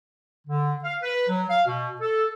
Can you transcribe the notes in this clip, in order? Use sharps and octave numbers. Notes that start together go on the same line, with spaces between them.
D3
F5
B4
F#3
F5
B2
A4